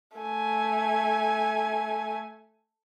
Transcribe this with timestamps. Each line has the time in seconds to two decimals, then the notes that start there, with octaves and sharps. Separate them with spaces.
0.17 A3 G#5